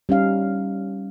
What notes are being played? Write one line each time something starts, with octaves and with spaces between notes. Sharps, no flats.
G3 C#4 D#4 F5